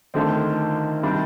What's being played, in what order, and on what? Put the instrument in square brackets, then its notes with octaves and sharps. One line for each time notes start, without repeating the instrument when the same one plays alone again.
[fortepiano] D2 D3 F3 C4 [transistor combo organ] D#3
[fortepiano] C3 G3 D4